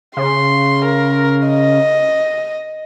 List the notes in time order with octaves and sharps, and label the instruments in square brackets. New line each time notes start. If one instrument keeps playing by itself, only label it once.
[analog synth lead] C#3 [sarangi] C6
[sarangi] A#4
D#5